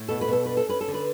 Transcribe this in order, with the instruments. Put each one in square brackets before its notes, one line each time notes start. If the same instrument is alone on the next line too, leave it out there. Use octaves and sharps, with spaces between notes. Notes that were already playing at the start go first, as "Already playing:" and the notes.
Already playing: [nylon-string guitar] A2
B2 A4
B4
B2 A4
D4 B4
A4
C#4 B4
A4
D3
B4